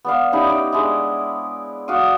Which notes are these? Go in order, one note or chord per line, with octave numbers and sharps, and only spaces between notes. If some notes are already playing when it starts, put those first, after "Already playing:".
B3 D5 F5
G3 C#4 D#4 E4
D#4 D5
G#3 D4 E4
F#4 D5 F5 D#6